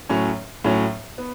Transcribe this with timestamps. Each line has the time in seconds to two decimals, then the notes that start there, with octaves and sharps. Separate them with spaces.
0.09 A2 F#3 C#4
0.64 A2 F#3 C#4
1.18 B3